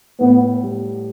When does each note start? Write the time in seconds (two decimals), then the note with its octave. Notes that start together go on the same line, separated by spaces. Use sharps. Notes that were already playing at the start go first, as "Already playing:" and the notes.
0.20 A2 B3
0.63 G3